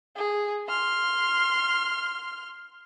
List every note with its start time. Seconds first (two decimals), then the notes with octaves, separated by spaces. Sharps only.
0.16 G#4
0.67 C6 F6